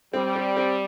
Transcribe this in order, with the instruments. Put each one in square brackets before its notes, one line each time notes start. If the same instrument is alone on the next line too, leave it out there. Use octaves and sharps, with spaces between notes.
[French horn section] G3 [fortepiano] C4
[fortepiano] C4
C4